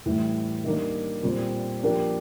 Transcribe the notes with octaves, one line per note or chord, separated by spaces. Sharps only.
A2 E3 G3
D#3 G3 A#3 D4
A#2 G3 C4
F3 A#3 D4 G4 A#4